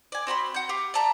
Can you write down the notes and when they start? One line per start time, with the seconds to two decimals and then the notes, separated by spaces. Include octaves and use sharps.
0.12 D5 G#5
0.27 C4 F#4 B5 C6
0.54 F#5 G6
0.69 G4 F5
0.94 D5 E5 A5 A#5